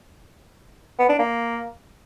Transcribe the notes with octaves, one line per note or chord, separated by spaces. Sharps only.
B3
D4
A#3